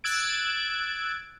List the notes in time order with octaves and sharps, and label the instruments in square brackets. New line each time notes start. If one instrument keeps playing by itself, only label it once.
[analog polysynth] E6 F#6 G#6 A6 D7